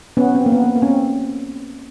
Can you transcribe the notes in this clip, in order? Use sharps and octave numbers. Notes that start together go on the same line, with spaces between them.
B3 C#4
C4
A#3
B3
A#3
A#3
C#4
C4